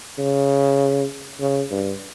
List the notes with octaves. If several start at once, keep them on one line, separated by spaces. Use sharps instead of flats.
C#3
C#3
G2